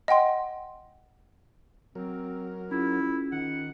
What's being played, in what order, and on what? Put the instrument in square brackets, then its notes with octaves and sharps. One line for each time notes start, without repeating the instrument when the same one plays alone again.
[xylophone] D#5 F#5 G5 C6
[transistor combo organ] F#3 A#4 [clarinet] C4
[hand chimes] C#4 F4 G#4 [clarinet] E4
[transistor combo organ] D#3 [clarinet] F#5